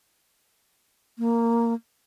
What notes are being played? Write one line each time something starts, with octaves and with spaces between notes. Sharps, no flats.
A#3